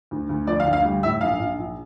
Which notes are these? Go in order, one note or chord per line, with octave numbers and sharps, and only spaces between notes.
D2
D2
F3 D5
F5
D2
F5
G3
A2 E5
A#1 F5
A#1
A#1